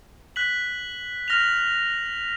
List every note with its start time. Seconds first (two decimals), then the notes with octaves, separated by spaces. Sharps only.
0.36 F#6 B6 F#7
1.28 F6 A#6 F7